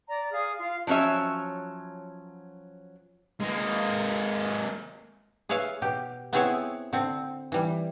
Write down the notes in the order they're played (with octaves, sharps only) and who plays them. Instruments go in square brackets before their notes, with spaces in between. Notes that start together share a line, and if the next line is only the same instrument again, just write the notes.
[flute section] D5 A#5
G#4 F5 D#6 F6
F4 F5
[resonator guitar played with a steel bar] F3 F#3 C#4 C#5 E5
[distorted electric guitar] G#3 A#3
[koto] G#4 B4 C#5 E5 F5
B2 G4
B3 C4 E4 G#4 C#5 E5
D3 C4
E3 G3